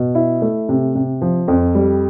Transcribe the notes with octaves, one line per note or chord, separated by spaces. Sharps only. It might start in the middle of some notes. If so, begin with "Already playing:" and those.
Already playing: B2
E4
A3
C3
C3
F3
F2
G3